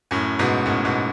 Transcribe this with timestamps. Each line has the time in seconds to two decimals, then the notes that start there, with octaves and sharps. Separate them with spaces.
0.11 F#2 A2
0.39 G#2 B2
0.66 F#2 A2
0.85 G#2 B2